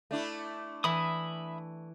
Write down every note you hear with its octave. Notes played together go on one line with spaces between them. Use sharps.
A3 D4 E4
E3 E5 B5 D#6